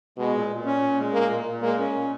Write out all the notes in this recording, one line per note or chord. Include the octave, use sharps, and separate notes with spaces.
B2 G#3
A#2
A#2
C#4
A#2
G#3
A#2 A#3
A#2
A#2
G#3 A#3
C#4
A#2